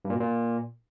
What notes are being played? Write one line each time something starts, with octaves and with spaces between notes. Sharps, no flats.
G2
A#2
B2
A#2